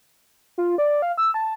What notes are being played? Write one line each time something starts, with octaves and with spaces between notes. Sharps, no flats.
F4
D5
F5
E6
A5